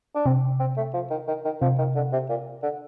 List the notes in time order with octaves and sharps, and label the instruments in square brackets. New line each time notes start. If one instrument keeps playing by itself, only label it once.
[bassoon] D4
[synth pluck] C3 [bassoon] C4
[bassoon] C4
A3
F3
D#3
D#3
D#3
[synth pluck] C3 [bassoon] F3
[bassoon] D#3
D3
C3
A#2
D3